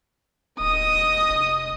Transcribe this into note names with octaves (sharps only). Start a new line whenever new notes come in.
D1 D#5 D#6
E1
F1